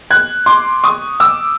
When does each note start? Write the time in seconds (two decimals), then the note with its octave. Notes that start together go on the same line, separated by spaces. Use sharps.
0.11 F#6 G#6
0.46 C6 D6
0.84 C#6 D#6
1.20 D6 E6